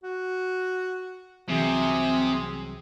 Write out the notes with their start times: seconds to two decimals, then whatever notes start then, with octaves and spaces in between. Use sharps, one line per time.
0.03 F#4
1.49 C2 C3 E3 F#3 G#4